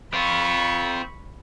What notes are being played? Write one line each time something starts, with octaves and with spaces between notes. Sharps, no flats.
C4 F4 B5 C#6